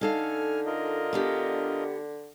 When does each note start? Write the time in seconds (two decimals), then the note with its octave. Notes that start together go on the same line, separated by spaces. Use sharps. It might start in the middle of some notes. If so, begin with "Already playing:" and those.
0.01 D3 D#4 A4 F5 G#5 F6
0.66 F4 A#4 D#5
1.13 B3 D4 G4